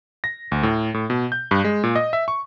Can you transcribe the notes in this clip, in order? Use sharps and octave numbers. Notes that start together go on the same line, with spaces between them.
A#6
D2
A2
A2
B2
G6
G2
G#3
A#2
D#5
E5
C#6